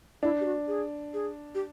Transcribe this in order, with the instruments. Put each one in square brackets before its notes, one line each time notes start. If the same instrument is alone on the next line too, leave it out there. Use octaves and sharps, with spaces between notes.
[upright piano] D4 [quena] E4
[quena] G4
F#4
G#4
G#4
G4